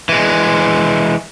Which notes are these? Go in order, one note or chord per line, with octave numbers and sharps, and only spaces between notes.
E3 G#3